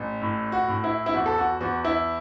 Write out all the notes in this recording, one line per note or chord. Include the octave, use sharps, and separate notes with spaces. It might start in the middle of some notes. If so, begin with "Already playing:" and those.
Already playing: A1
A2
F#4
A2
E4
E4
E2 F#4
A4
F#4
E2 F#4
E4